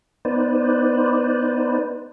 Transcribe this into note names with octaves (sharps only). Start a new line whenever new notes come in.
B3 D#4 B4 C5 D5